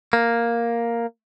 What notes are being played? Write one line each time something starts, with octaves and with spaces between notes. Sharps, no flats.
A#3